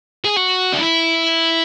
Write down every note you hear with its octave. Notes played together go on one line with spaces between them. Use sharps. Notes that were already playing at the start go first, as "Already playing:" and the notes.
G#4
F#4
D4
E4